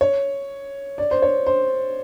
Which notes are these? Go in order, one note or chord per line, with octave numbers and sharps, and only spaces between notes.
C#5
D5
C5
C#5
C5